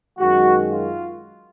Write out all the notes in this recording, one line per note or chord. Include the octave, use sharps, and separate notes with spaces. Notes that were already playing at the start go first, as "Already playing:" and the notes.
F#2 D#3 G#3 F#4
F4